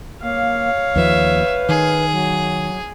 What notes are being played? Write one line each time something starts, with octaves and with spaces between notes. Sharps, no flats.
A#3 C#5 F5
D#2 F3 B4 E5
D#3 G#4
F#3